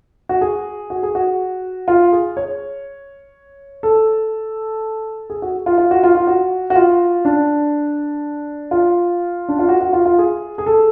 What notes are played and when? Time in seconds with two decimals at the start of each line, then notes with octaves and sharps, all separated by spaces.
0.29 F#4
0.41 G#4
0.90 F#4
1.03 G#4
1.15 F#4
1.88 F4
2.12 G#4
2.37 C#5
3.83 A4
5.30 G#4
5.42 F#4
5.66 F4
5.78 F4
5.91 F#4
6.03 F4
6.15 F4
6.27 F#4
6.70 F#4
6.76 F4
7.25 D4
8.71 F4
9.49 D4
9.59 F4
9.69 F#4
9.81 F#4
9.93 F4
10.06 F4
10.18 G#4
10.58 G#4
10.66 A4